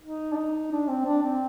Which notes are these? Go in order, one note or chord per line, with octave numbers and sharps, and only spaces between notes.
D#4
D4
D#4
D4
C4
D4
C4